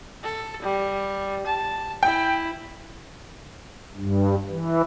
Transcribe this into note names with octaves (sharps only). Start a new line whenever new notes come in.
A4
G3
A5
E4 G5
G2
E3